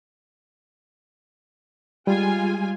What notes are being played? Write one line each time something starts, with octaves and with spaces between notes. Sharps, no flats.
G3 G#3 F4 G#5